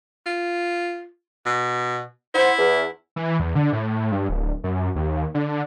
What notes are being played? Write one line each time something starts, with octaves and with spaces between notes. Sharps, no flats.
F4
B2
E4 C5 F#5
E2
E3
E2
D3
A2
G2
D1
F#2
D#2
D3